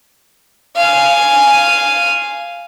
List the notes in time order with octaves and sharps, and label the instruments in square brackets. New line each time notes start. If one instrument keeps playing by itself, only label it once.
[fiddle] F5 G#5